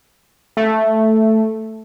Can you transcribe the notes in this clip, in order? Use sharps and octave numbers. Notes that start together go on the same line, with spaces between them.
A3